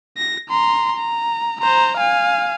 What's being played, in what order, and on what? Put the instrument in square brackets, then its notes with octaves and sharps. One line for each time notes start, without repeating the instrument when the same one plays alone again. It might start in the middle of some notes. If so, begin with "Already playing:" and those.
[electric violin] A#6
A#5 C6
A#5
C5 A#5
F5 G#5